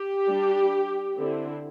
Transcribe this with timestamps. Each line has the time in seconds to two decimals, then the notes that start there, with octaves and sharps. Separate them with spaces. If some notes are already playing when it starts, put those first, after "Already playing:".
Already playing: G4
0.27 G3 D4
1.17 D3 C4 E4